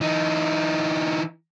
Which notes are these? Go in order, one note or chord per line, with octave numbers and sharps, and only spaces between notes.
E3 D#4